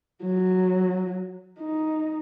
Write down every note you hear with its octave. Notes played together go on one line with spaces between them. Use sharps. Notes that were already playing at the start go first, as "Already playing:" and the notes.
F#3
D#4